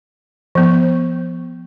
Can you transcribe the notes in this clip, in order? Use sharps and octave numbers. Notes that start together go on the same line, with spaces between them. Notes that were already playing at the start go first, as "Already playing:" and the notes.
F3 B3